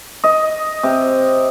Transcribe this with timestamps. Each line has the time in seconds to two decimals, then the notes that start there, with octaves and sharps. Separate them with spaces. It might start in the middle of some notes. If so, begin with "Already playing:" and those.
0.24 D#5
0.83 C3